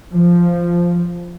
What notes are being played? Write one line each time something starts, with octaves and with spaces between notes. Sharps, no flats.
F3